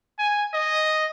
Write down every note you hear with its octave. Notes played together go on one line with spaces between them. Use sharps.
G#5
D#5